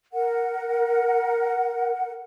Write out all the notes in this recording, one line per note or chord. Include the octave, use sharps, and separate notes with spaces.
A#4 F#5